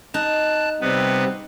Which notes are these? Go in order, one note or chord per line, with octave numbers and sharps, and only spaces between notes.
D#4 A5 F#6
C3 G3 B3 C4 B4